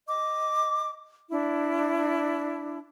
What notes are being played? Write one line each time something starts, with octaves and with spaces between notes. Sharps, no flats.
D#5 D6
D4 E4